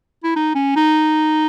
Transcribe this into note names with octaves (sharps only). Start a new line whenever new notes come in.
E4
D#4
C#4
D#4